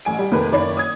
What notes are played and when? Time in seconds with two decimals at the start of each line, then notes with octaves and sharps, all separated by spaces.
0.05 A1 G#5 D7
0.19 G3
0.31 F1 D#2 A#2 B4
0.52 F#1 D#3 C#5 D5 B5
0.77 D#6 G#6